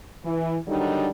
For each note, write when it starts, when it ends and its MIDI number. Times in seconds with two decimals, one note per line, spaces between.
0.24 0.56 52
0.67 1.07 50
0.67 1.07 51
0.67 1.07 54
0.67 1.07 55
0.67 1.07 62
0.67 1.07 63